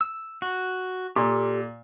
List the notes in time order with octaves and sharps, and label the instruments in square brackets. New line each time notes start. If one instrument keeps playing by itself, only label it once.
[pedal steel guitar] E6
F#4
[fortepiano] A#2 [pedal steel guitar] G4 A4